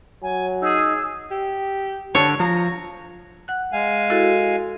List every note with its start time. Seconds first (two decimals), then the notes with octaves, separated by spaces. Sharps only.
0.23 F#3 G#5
0.62 D#4 G#4 E6
1.31 G4
2.15 D3 C#5 A5
2.40 F3 A#5
3.48 F#5 F#6
3.73 G#3 F5 G#5
4.10 E4 F#4 A4